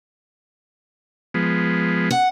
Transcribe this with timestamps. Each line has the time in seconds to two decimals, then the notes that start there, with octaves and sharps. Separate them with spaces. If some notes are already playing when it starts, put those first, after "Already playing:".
1.34 F3 G#3 B3
2.11 F#5